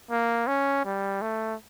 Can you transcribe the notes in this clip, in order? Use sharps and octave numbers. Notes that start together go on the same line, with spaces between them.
A#3
C#4
G3
A3